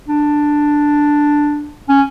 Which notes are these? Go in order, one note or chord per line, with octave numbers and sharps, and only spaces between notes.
D4
C#4